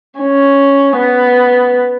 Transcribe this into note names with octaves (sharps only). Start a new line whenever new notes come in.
C#4
B3